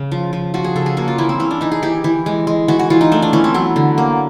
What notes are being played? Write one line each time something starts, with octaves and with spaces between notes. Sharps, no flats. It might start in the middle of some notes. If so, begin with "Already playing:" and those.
Already playing: C#3
F3
F3
F3 F#4
G#4
C#3 A4
G#4
A#3 F#4
F4
E3 E4
C4
E3 C#4
D4
E3 D#4
G#4
E3 G4
E3
G#3
G#3
E3 F#4
F#4
E3 F4
D#4
A3 D4
D4
E3 C#4
C4
F#3 B3
D3
A#3